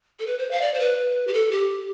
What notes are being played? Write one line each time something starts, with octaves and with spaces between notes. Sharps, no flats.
A4
B4
C5
F5
D5
C5
B4
G4
A4
G4